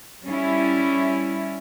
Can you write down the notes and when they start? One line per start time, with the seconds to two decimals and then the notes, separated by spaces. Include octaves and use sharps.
0.25 G3 C#4 E4